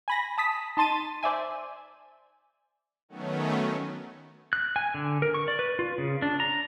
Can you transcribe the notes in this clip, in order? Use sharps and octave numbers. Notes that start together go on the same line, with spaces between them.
G#5 B5 A#6
A5 D#6 B6
D#4 A5 C6 A6 D#7
C5 D5 E5 G#5
D#3 F#3 A3 B3 C#4
F#6
G#5
D3
A#4
C#6
D5
B4
F4
C#3
D4
A#5